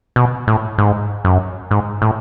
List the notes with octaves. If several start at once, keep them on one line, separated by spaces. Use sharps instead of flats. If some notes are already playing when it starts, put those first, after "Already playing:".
B2
A2
G#2
F#2
G#2
A2